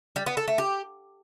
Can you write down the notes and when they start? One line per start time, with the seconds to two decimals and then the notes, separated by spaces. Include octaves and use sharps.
0.16 G3
0.26 B3
0.37 A4
0.48 A3
0.58 G4